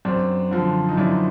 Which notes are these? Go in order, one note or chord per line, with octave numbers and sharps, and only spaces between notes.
F#2 C4 D4
D3 F3
D#4
F#2 D4 E4